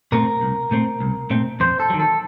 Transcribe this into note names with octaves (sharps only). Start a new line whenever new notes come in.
A#2 A3 C4 A#4
C2
A#2 A3 C4
C2
A#2 A3 C4
F2 C5
A4
D#3 F#3
A4